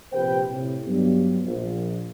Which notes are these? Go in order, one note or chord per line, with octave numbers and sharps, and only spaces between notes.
A#1 C3 G4 B4 C5 G5
A2 C3
G2 F#3 B3
A#1